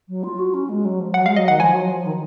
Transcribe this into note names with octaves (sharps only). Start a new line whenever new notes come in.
F#3
F4
F#4
C#4
G#3
F#3
F3
F#3 F#5
G#3 F5
F#3 D#5
D#3 F#5
F3 G#5
F#3
F3
D#3